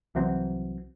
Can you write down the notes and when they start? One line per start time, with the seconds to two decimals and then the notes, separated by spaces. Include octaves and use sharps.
0.15 C2 E3 F#3 C4